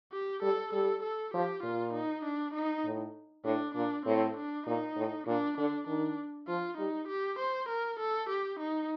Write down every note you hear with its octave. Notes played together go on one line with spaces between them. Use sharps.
G4
G3 A4
G3 A4
A4
F3 G4
A#2 F4
D#4
D4
D#4
A2
A2 D4
A#2 D4
A2 C4
D4
A#2 D#4
A2
A#2 D4
D3 D4
D#3 D4
F3 F4
G3 D#4
G4
C5
A#4
A4
G4
D#4